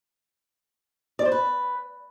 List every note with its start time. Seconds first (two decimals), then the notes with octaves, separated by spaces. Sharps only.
1.19 D5
1.25 C5
1.32 B4